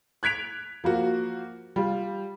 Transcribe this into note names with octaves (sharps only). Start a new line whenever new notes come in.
F#6 G#6 B6 D7 F7
F3 A#3 F#4
G3 F4